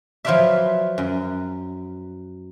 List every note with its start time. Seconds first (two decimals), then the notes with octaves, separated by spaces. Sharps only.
0.25 F3 F#3 F4 B4 D5 E5
0.98 F#2